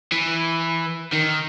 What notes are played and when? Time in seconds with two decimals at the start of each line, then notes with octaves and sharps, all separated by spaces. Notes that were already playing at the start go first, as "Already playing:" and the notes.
0.12 E3
1.12 D#3